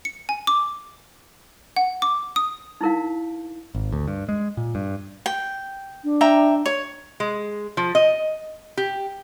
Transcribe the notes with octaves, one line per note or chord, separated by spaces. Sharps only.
C#7
G#5
D6
F#5
D6
D#6
D#4 E4 A#4 F5
G#1
D2
G2
G#3
A#2
G2
G5
D4
E5 G5 A#5
C#5
G#3
F3
D#5
G4